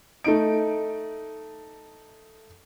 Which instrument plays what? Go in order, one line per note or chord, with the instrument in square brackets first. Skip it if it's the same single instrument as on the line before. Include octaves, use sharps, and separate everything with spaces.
[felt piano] A3 D#4 D7